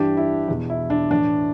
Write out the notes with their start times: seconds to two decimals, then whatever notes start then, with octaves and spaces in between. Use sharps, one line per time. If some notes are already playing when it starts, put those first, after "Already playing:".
Already playing: G2 E3 D4 G4
0.17 E4
0.48 E2 B2
0.70 E4
0.90 D4
1.11 A2 E3 D4